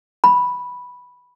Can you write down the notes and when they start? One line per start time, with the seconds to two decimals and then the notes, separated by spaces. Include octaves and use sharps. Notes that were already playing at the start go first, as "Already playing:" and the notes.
0.24 B5